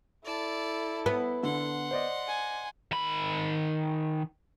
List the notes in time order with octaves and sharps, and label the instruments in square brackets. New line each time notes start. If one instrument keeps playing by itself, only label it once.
[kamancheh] E4 A4 [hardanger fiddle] D5 A5
[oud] B3 [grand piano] B5
[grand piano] D3 [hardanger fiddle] F#5 C6
[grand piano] C5 D5 D#5
[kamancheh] G#5
[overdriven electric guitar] D#3 B5